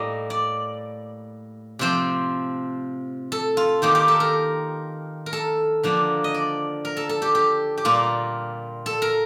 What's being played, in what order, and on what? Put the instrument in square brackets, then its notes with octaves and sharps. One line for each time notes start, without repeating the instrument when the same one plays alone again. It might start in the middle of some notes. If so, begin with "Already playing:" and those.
Already playing: [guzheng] A2 G3 A#3 D#5
D5
C3 F3 C4 C5
A4
F4
D#3 A#3 D#4 G4
G4
A4
A#4
A#4
A4
D3 F3 A#3 D4
D#5
D5
A#4
A4
A4
G4
G4
G4
A#2 G3 A#3 F4
A4
A#4